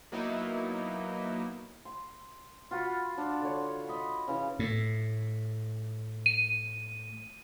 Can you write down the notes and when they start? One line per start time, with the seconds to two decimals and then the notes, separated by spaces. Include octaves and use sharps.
0.12 F#3 A#3 B3 D#4 E4
1.85 C6
2.71 F4 F#4 F#5 B5
3.18 D4
3.41 D3 C#5
3.88 D#5 B5
4.28 C#3 E3
4.59 A2
6.26 D#7